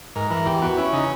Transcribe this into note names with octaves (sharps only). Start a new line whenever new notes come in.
G#2 A#4
E3 A#4
E2 G4
B3 F#4
C#4 E4
C#3 D#4